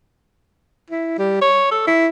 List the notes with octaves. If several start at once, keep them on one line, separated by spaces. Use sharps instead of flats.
E4
G3
C#5
A4
E4